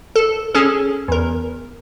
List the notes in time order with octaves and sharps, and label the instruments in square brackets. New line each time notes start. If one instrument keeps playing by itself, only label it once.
[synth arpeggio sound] A4
C#4 G#4 A4
E2 A#4